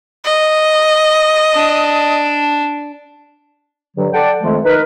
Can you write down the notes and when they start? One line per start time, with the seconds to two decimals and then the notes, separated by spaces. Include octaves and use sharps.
0.25 D#5
1.55 D4
3.96 G2 D3 F#3
4.12 A4 D5 F#5 G5 A5
4.40 F2 D#3 F3 G#3 A3
4.64 D#4 A#4 B4